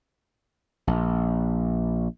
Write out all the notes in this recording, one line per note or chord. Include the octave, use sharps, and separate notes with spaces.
A#1